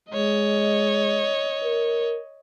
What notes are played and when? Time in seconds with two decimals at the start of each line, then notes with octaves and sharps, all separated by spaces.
0.11 G#3 C#5 D#5
1.64 A#4